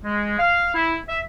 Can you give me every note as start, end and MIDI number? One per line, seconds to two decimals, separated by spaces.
0.04 0.37 56
0.39 0.73 77
0.75 0.95 64
1.08 1.20 76